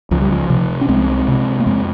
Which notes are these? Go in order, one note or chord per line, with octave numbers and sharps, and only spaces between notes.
C#2 F3
G3
F3
C3 F3
C#4
C2 G#3 C4
C3
A#3
F2 G#3 C4